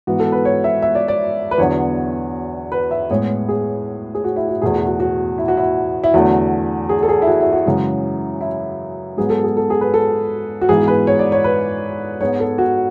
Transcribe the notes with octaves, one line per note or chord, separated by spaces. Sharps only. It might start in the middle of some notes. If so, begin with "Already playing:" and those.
G#2 E3 B3 F#4
A4
B4
C#5
E5
E5
D5
D5
B4
E2 D3 F#3 B3 C#5
B4
E5
A2 G#3 B3 C#5
G#4
G#4
F#4
E4
F#4
E2 B2 A3 G#4
F#4
F#4
F#4
E4
F#4
E4
E4
E2 D3 F#3 A3 F#4
G#4
A4
G#4
E4
F#4
E4
F#4
F#2 C#3 E3 G#3
E4
G#2 F#3 B3 G#4
A4
G#4
A4
G#4
B4
A4
F#4
G#2 E3 B3 G#4
B4
C#5
D5
C#5
B4
G#2 G#3 B3 C#5
A4
F#4